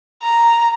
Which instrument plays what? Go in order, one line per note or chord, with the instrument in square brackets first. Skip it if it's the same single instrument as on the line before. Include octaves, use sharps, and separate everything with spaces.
[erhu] A#5